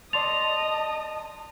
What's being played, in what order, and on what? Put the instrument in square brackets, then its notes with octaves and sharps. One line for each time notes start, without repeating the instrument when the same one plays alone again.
[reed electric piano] D5 C6 A6 [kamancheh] D#5 D#6 [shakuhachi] A5 [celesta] F7